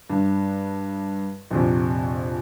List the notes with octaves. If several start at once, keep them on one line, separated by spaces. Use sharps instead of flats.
G2
A#1 F2 C3